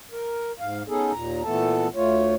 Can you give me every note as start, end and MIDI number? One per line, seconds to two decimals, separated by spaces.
0.12 0.52 70
0.60 0.83 44
0.60 0.83 77
0.88 1.12 59
0.88 1.12 61
0.88 1.12 63
0.88 1.12 68
0.88 1.12 69
1.12 1.42 39
1.12 1.42 46
1.12 1.42 82
1.44 1.88 46
1.44 1.88 52
1.44 1.88 57
1.44 1.88 59
1.44 1.88 69
1.44 1.88 81
1.95 2.35 38
1.95 2.35 57
1.95 2.35 65
1.95 2.35 73